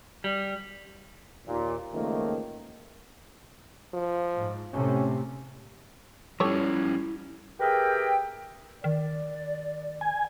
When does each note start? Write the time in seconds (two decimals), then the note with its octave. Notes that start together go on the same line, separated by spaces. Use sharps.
0.24 G3
1.47 D#2 A#2
1.94 C#2 D#3 F3 A3 A#3
3.94 F3
4.36 G#2
4.74 A2 C3 A3 C#4
6.40 F3 G3 C#4 E4 G4 A4 C#5
7.60 G4 G#4 A#4 B4 E5 G5
8.84 D#3 D5
10.01 G#5